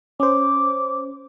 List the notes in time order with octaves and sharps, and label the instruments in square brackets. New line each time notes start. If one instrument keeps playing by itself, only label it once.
[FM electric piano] C#4 C5 [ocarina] D6